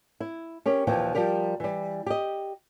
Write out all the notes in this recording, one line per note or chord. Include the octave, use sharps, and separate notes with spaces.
E4
C#4 G4 A#4
D#2 A#2 E3 F3 G5
F3 G3 G4 A#4
E3 G3
G4 D#5